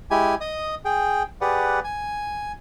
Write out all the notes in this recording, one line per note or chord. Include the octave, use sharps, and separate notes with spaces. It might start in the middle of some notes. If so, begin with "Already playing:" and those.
G#3 E4 G4 G#5
D#5 D#6
G#4 G5
G4 G#4 B4 D5 F#5
G#5